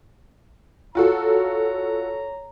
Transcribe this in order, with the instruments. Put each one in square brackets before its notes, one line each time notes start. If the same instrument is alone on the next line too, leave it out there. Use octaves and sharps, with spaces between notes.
[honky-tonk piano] F4 F#4 A4 [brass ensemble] C#5 A#5